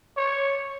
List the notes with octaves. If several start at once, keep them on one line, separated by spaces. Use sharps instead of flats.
C#5